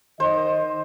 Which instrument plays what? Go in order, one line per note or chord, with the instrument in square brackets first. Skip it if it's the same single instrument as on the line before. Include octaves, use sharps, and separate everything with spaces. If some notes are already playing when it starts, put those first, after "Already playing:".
[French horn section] D#3 D#5 [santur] C5